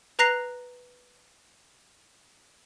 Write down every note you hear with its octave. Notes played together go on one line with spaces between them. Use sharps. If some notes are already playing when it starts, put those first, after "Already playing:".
B4 A#5 F#6 A#6 C7 F7